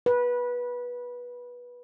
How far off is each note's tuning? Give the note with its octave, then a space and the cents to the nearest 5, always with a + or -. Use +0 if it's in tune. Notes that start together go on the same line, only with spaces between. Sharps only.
B4 -15